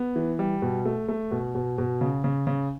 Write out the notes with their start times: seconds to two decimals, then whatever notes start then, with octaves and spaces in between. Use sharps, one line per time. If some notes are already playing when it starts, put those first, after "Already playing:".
Already playing: B3
0.16 E3
0.39 G3
0.62 B2
0.85 A3
1.08 A3
1.31 B2
1.55 B2
1.78 B2
2.01 C#3
2.24 C#3
2.47 C#3